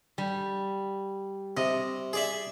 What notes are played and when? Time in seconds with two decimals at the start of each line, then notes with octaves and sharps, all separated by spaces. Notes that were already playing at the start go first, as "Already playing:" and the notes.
0.18 G3
1.57 C3 D#5
2.13 G#4 D5 E5